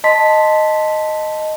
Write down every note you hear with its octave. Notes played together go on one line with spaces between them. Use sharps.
D#5 A5 C6 B6